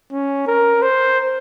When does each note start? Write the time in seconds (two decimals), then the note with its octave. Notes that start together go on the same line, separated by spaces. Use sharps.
0.12 C#4
0.47 A#4
0.82 C5